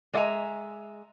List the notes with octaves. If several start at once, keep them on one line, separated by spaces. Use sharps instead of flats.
G#3 D5 E5 F#5 G#5 A#5